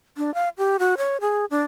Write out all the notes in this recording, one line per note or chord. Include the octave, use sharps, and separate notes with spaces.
D4
F5
G4
F#4
C#5
G#4
D4